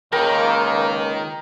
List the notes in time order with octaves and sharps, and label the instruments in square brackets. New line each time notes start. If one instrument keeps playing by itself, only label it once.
[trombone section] C#2 A#3 [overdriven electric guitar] D#3 D#4 [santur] A#4 G5 A#5